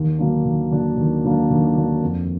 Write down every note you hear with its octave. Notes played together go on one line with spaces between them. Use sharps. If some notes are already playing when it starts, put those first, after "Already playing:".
Already playing: D#2
D3 F#3 A#3 D4
D#2
D3 F#3 A#3 D4
D#2
D3 F#3 A#3 D4
D#2
D3 F#3 A#3 D4
F2